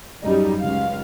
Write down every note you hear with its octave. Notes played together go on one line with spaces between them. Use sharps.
F#2 G3 D#4
C#2 F5